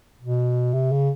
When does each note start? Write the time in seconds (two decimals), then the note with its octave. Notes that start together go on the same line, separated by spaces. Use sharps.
0.21 B2
0.73 C3
0.92 C#3